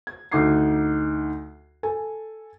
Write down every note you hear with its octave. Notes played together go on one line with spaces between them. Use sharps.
G#6
D2 D#4 D6 G#6 C7
A4 G#5